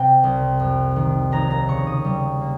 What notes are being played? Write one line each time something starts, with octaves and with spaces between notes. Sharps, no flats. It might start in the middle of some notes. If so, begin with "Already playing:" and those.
Already playing: C3 G5
C2
F2
D#3
D#2 A#5
A#5
C#3 C#6
D#6
G3
A#3